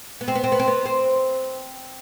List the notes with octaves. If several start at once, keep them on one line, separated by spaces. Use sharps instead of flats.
B3
C4
B3
C4
B3
C4
B3
C4